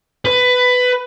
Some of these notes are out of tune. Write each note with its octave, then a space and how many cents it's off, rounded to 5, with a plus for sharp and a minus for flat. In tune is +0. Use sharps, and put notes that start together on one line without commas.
B4 +15